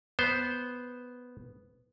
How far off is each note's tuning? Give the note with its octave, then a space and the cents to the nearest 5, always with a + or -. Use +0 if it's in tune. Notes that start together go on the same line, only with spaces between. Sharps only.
B3 +0 C5 +0